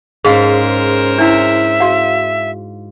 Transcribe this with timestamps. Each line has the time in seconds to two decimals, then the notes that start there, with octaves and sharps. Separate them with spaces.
0.25 G#2 C#4 G#4 A#4 C5 F5
1.18 D4 E4 E5
1.80 F#4 F5